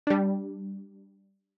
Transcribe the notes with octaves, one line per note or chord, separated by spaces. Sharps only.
G3 D4